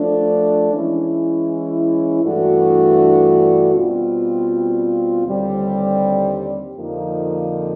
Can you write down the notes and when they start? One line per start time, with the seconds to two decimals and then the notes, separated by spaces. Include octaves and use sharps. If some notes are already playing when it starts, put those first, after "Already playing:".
Already playing: F3 A3 D4
0.72 E3 G#3 C#4 E4
2.22 G2 E3 A3 D4 F#4
3.73 B2 G3 C4 F4
5.24 D#2 D3 G3 C4
6.75 F2 D3 F3 A#3 D#4